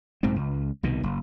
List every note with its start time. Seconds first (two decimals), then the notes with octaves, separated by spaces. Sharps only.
0.23 B1 G#2 C3 C4
0.36 C#2
0.83 C2 B2 D#3
1.03 F#1